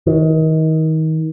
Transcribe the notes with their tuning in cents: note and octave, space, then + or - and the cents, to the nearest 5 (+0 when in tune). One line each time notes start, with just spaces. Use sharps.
D#3 +30